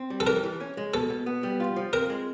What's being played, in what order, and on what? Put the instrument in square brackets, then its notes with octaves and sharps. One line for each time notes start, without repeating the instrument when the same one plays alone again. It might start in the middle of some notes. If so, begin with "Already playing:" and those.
Already playing: [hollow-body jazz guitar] C4
G3
[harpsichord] A4
[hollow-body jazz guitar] E3 [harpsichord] A#4
[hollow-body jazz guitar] E3
C#4
G#3
[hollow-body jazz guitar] B2 [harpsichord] A4
[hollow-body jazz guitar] B2
B3
G3
F4
F3
[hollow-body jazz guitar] C4 [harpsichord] A#4
[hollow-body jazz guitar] G#3